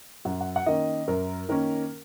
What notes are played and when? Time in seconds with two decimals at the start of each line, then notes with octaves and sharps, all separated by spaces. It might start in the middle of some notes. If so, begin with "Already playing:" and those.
0.25 F#2 F#5
0.41 F#5
0.56 F#5
0.66 D#3 A#3 C#4 D#5
1.08 F#2 A#4
1.49 D#3 A#3 C#4 A#4